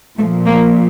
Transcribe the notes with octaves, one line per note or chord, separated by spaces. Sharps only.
A#2 F3 A3
A#3